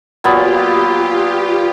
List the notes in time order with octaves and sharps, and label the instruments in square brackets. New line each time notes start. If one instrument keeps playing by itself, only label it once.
[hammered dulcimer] A#2 F#3 B3 [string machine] F4 G4